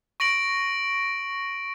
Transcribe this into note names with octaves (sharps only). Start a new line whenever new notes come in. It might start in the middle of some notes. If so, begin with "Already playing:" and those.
C#6 A#6 D7 F#7